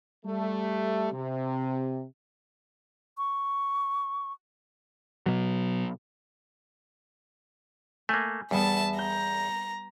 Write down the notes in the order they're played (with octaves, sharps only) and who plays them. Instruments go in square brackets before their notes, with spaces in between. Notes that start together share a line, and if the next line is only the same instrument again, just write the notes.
[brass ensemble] G3 A3
C3
[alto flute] C#6
[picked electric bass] B2 F#3
[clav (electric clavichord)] A3 A#3 [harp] G#5 G6 D#7
[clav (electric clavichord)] E2 [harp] G3 B3 [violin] E5 A5
[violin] A#5 [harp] G6